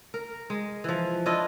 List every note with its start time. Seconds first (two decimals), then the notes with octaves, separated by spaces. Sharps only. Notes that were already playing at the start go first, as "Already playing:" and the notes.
0.14 A#4
0.50 G#3
0.84 E3 F3
1.26 D4 E4 F4 D#5